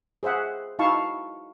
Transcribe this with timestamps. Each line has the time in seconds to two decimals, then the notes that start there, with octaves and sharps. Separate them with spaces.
0.23 G#4 C5 E5 F#5
0.79 D#4 E4 F#4 F5 A5 C#6